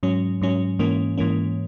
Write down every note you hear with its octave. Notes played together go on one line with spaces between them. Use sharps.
G#2 F#3 C#4
G#2 F#3 C#4
G#2 E3 A#3 C#4
G#2 E3 A#3 C#4